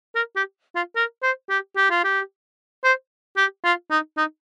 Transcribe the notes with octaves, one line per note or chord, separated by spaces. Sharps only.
A#4
G4
F4
A#4
C5
G4
G4
F4
G4
C5
G4
F4
D#4
D#4